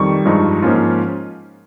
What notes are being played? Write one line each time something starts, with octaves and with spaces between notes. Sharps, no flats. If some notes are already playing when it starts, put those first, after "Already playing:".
Already playing: F2 D#3 G3 C#6
G2 F3 G#3 D#4
G#2 F3 A#3 C#4 F4